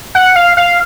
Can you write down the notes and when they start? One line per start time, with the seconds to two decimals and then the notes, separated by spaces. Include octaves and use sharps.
0.15 F#5
0.36 F5
0.57 F5